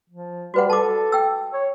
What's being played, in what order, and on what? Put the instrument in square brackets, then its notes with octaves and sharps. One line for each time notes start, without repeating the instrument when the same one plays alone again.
[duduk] F3
[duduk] G3 [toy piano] F#4 B4 F#5
[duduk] A4 [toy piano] A5 D6
[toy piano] G5 E6
[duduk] C#5